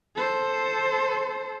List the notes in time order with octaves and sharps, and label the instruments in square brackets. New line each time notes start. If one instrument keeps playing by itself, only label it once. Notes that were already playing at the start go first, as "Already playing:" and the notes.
[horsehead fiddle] A4 C5